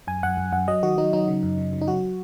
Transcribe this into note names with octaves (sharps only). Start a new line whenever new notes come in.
F#2 G#5
F#2 F#5
F#2
F#2 F#5
F#3 D#5
D#3 F#4
F#3 D#4
F#3 D#4
C#3
F#2
C#3
C#3
D#4
F#3 F#4